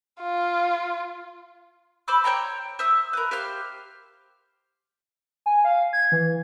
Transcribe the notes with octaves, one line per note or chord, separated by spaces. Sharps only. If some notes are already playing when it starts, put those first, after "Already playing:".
F4
C5 B5 D6 E6
C5 C#5 G5 A#5
C5 E5 D#6 E6
A#4 B4
G4 C5 F5 F6
G#5
F5
G#6
E3